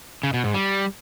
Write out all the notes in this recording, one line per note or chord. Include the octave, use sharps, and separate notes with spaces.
C#3
B2
G#2
G3